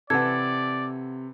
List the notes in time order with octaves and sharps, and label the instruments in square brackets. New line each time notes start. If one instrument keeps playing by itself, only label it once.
[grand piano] C3 [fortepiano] E3 A4 [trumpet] D5 [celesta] F#5 G#6